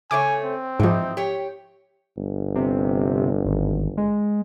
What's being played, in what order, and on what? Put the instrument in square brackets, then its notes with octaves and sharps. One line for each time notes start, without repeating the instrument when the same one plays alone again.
[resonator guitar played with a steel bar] C#3 A3 C#5 [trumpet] G#5 [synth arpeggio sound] D6
[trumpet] C4
[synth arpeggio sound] G#2 F3 [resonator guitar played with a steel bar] E3 D#4
[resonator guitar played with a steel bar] G4 C#5
[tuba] G1
[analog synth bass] C3
G#1
G#3